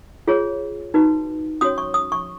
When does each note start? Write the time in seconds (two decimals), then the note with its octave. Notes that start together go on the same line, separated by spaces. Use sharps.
0.27 F4 G#4 C#5
0.94 D#4 F#4 B4
1.61 C#4 F#4 C#5 D#6
1.78 C#6
1.94 D#6
2.12 C#6